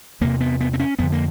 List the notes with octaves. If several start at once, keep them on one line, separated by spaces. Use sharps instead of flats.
E2 C3 A#3
B3
B3
C4
C#4
F2 D3 B3
A#3